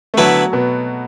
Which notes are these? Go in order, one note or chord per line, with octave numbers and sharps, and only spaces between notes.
A3
D3 F#3 B3 E4 B4
B2 B3